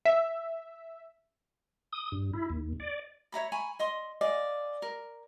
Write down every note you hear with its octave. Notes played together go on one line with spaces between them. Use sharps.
E5
D#6
G2
E4
D#2
D5
C#5 E5 A#5 B5
G#5 A#5 B5 C#6
D#5 C6
D5 D#5 F5 G#5
A#4